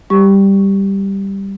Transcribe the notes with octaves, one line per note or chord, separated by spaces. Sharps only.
G3 G4 C#6